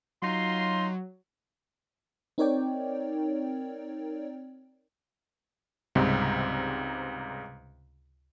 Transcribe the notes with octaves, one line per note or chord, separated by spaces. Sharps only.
F#3 D#4 F4 C6
C4 D#4 A#4 C#5 D5 G5
C#2 G#2 C3 G3 C4